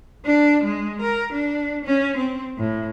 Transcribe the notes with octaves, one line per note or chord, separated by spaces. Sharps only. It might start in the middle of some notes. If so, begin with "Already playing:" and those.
D4
G#3
A#4
D4
C#4
C4
A2